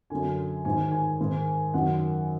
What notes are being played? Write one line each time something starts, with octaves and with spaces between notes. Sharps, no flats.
F#2 D3 G#5
G#2 D#3 G#5
G#5
G#2 D#3
F#2 D#3 F#5